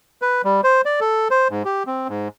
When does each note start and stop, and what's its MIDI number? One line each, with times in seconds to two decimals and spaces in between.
0.22 0.42 71
0.44 0.61 55
0.64 0.81 72
0.85 1.00 74
1.01 1.28 69
1.31 1.48 72
1.50 1.63 44
1.65 1.83 67
1.87 2.08 60
2.09 2.28 44